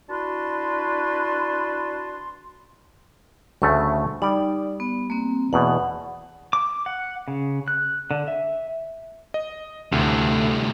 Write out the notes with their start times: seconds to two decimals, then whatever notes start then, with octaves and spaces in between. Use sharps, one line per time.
0.09 D4 E4 F#4 B4 A5 C6
3.62 D2 C#3 A3 C#6
4.22 G3 D#4 D5
4.80 B3
5.10 A#3 C4
5.53 E2 B2 F#5
6.53 D6
6.86 F#5
7.28 C#3
7.68 F#6
8.11 D3
8.28 E5
9.34 D#5
9.92 D2 A2 C3